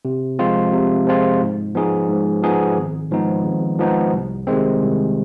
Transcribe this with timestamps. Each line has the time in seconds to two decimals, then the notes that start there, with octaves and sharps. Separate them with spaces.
0.05 C3
0.39 F3 G#3 C4 F4
0.73 C3
1.07 F3 G#3 C4 F4
1.41 G#2
1.75 F3 B3 D#4 G#4
2.09 G#2
2.43 F3 B3 D#4 G#4
2.77 G#1
3.11 G#2 F3 B3 D#4
3.45 G#1
3.78 G#2 F3 B3 D#4
4.13 C2
4.47 C3 D#3 G#3 C4
4.81 C2